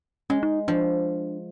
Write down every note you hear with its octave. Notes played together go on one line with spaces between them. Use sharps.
G#3 C#4
D#4
F3 D4